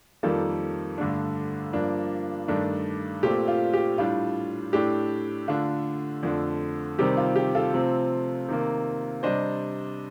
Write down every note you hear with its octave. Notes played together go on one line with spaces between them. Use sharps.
F2 D#3 G3 A#3 F4 A4
G2 D3 A3 D4
G2 F3 A#3 D4
G2 D#3 A3 D4
A#2 A3 C4 G4
F4
G4
A2 G3 D4 F4
A2 A3 D4 G4
D3 A3 D4 F4
F2 D3 A3 D4
C3 D#3 G3 C4 G4
F4
G4
F4 A4
C3 F3 A3 C4
C3 D#3 A#3
C3 G3 D4 C5 D#5